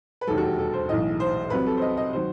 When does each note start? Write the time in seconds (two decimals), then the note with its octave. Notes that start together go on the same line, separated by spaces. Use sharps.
0.21 B4
0.27 E1 D#2 D#3 F#3 A4
0.38 F#4
0.43 G4
0.58 A4
0.73 C5
0.89 B1 A2 E3 D#5
1.20 C5
1.50 C2 C3 F#3 B4
1.66 A4
1.77 C5
1.82 D#5
1.97 D#5
2.13 D#3 F#3 C5